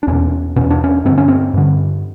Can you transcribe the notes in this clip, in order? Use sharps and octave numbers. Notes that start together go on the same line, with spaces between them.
D4
E2 B2 C#4
E2 B2 C#4
D4
C#4
G2 D3 C4
C#4
C4
G2 D3